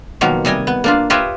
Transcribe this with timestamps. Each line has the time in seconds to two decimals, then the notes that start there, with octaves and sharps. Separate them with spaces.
0.21 B2 D#3 F3 F#3 A#3
0.45 C3 G3 D#5 G#5
0.67 B3
0.84 A#3 D4 F4
1.10 F4 G4 B4 C#5 D#5 E5